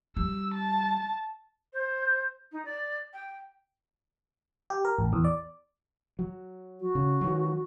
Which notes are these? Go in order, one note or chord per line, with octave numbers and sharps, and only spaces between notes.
G3 E6
A5
C5
D#4
D5
G5
G4
A#4
A1
E2
D5
F#3
F#4
C#3
D#3 F#3